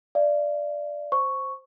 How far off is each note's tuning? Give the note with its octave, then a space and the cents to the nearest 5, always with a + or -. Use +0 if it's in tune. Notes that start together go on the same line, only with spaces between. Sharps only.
D5 +0 F5 -45
C5 +0 C#6 +0